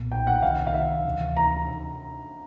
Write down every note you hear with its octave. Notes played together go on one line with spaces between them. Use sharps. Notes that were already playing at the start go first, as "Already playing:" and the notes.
Already playing: B1 A#2 B3
G5
F#5
C2 C3 D#3 F5
F5
E5
D2 C3 E3
A#5